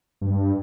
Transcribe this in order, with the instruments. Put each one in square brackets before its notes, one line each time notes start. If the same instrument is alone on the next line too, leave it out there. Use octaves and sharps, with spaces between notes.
[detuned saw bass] G2